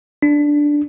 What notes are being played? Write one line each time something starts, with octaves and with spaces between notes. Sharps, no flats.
D4